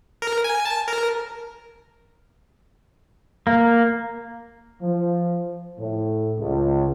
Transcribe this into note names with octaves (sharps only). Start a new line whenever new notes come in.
A#4
G#5
A5
A#4
A#3
F3
A2
C#2